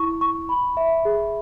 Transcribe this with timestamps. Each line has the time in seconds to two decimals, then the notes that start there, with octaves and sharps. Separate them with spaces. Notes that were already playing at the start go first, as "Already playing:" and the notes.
Already playing: E4 C#6
0.21 C#6
0.49 B5
0.77 E5
1.05 G#4